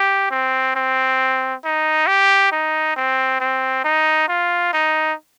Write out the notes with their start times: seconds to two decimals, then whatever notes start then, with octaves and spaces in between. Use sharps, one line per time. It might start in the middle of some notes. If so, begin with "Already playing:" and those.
Already playing: G4
0.31 C4
0.75 C4
1.64 D#4
2.07 G4
2.52 D#4
2.96 C4
3.40 C4
3.84 D#4
4.28 F4
4.73 D#4